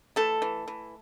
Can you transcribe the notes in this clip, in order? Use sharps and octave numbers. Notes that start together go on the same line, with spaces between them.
E3 A3 A4
E3
E3